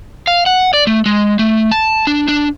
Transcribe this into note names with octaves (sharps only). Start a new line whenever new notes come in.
F5
F#5
D5
A3
G#3
A3
A5
D4
D4